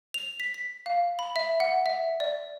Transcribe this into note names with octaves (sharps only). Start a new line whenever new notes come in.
F7
B6
B6
F5
B5
E5
F#5
E5
D5